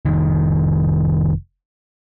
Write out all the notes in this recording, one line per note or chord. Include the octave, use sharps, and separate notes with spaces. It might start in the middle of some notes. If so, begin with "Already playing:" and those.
F1 D#3